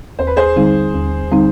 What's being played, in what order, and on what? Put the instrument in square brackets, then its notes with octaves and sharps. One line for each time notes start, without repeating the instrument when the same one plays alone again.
[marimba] D#2 [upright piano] C5
[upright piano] B4
G#4 C5
[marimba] D3 G3 C4 D#4
D#2
D3 G3 C4 D#4